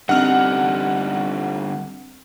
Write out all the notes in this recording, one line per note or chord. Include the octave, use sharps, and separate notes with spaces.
D3 G3 C4 D4 D#4 F#5 F6